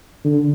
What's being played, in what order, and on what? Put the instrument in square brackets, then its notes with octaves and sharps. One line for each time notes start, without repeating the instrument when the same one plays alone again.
[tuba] D3